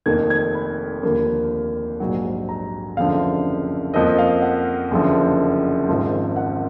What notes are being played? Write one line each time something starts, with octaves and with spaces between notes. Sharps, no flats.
F1 F2 D#3 A#3 G#6
G#6
B5
D#2 D3 F3 A#3
A#1 G#2 F#3
A#5
F#1 F2 D3 F3 F5
F2 F3 A#3 D#5
F5
F#5
F#1 F2 D3 F3
G#1 G#2 F3
F#5